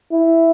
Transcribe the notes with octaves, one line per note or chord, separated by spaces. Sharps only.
E4